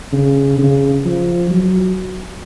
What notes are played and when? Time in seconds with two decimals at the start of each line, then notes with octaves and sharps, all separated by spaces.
0.13 C#3
0.58 C#3
1.05 F3
1.50 F#3